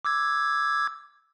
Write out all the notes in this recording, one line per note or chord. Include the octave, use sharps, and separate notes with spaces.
D6 E6 G#6